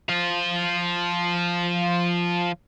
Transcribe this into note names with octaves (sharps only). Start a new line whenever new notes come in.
F3 F4